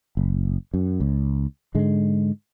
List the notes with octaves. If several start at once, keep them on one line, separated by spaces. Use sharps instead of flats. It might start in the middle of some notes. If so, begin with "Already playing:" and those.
F#1
F#2
C#2
G#2 D3 G#3